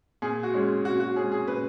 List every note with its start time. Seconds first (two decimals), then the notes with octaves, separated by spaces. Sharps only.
0.22 A#2 G#4
0.43 F#4
0.53 G#3 C#4
0.85 A#2 F#4
1.00 F#4
1.16 G#3 C#4 G#4
1.32 G#4
1.47 A#2 B4